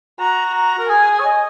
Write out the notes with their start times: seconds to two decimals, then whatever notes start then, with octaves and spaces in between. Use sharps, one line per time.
0.19 F#4 A#5
0.55 A#5
0.79 A#4
0.89 G#4 G#5
1.20 C#5
1.25 D#5